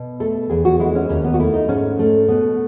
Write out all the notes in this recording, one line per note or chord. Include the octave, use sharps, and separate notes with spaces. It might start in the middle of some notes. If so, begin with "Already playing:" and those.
Already playing: B2
A3 A4
E2 G#4
F#4
G#3 E4
C#4
D#2 C#4
B3
F#4
A3 E4
D#4
G#2 C#4
A3
B2 B3